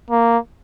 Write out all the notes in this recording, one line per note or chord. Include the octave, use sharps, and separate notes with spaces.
A#3